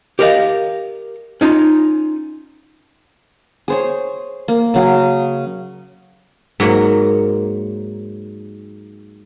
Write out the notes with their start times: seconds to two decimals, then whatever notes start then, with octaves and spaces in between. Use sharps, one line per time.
0.19 G4 A#4 D#5 F5
1.41 C#4 D#4 F4
3.68 G#4 C5 C#5
4.48 A#3
4.74 C#3 F#3 G#4
6.60 G#2 F#3 A#3